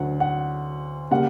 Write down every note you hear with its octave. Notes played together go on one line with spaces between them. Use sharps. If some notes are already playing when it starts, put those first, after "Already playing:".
Already playing: D2 D3 F#3 F#5
F#5
C#3 G3 A#3 F#5